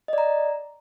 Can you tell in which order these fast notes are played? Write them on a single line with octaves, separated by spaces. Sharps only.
D#5 D5 A#5